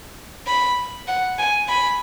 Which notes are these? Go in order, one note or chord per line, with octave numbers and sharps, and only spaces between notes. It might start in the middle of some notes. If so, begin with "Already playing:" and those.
B5
F#5
G#5
B5